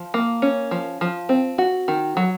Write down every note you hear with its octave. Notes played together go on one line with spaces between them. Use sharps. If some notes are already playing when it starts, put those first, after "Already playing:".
Already playing: F3
A#3
C#4
F3
F3
C4
F#4
D#3
F#3